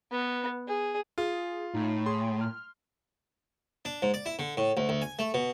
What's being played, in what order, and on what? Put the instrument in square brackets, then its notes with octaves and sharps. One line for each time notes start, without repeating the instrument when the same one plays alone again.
[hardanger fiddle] B3
G#4
[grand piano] F4 [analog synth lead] G#4
[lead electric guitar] A2 [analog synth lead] D#4
[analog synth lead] G#4 [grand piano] C6
[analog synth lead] F6
[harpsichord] D4
G#2
D5
E4
D3
A2
D2
D2
G#5
A3
B2